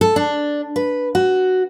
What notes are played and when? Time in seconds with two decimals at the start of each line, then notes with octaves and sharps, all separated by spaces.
0.01 A4
0.16 D4
0.76 B4
1.15 F#4